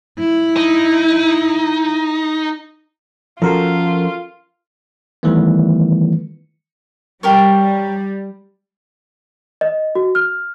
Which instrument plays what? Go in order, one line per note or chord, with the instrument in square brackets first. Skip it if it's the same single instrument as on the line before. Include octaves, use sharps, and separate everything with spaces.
[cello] E4
[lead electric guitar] D#4
[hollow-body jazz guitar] F3 C#4 F#4 [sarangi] F4 [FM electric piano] A4 A#4 C6
[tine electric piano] D#3 E3 G3 A3 B3
[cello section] G3 [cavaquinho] G4 A#4 C#5
[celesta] D#5
F#4
F6